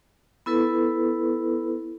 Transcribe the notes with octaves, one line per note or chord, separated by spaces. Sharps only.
B3 E4 A4 B4